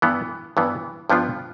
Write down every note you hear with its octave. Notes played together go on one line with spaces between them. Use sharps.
G2 E3 B3
G2 E3 B3
G2 F3 B3 D4 F4